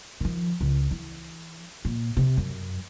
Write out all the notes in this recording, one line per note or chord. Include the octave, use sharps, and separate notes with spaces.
D#3 F3
C#2
E3
A#2
C3
F#2